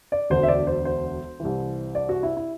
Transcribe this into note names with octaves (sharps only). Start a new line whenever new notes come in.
D5
E1 D2 D3 C5
E5
D5
C5
C5
C2 C3 E3
D5
F#4
E4
E4